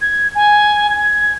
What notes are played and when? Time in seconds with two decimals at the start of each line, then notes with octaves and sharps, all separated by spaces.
0.01 G#6
0.35 G#5
0.90 G#6